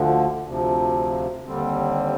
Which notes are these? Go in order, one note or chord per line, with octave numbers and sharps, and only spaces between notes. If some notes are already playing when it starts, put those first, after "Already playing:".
Already playing: D2 D3 F3
D2 C3 F3
D#2 D3 G3 C4